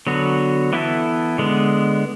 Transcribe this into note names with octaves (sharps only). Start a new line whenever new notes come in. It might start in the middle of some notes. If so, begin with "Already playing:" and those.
D3 F#3 B3 F#4
E3 B3 E4 A4
D3 G#3 B3